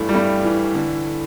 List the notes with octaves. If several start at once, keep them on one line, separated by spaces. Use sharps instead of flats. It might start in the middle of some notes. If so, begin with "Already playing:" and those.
Already playing: G2 E3 A3
G3
G2 A3
E3
D3